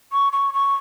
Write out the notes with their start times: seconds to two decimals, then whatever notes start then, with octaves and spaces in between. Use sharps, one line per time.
0.13 C#6
0.33 C#6
0.54 C#6